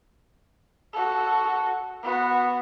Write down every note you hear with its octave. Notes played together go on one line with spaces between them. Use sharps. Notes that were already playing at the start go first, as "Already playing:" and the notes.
F#4 A4
B3 F#4